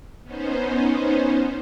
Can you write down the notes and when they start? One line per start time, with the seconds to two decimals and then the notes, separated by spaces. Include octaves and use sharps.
0.23 B3 C#4 D#4 C5